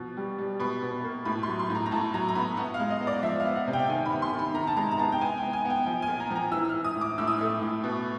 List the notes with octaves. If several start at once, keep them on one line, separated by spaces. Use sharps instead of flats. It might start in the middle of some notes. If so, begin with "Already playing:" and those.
Already playing: B2 F3
G3
G3
B2 B5
B2
A#3
A2 B5
C6
F#3
C6
A2
A#5
A#5
A2 A5
F#3 A#5
A#5
B3 B5
B3 F#5
F5
G#3
D#5
B3
D5
F3 E5
F5
B3
F#5
C3
G5
D#3 G#5
B5
B3
C6
D#3
B5
D#3 A#5
A5
G#3 A#5
A#5
B3 A5
G5
B3 G#5
B3 G5
G#5
B3 G5
F3 G5
G#5
A#2
A#5
F3
A#5
E3 E6
E6
E3 F6
D#6
A2
D6
A2 E6
D#6
A3 E6
A2
B2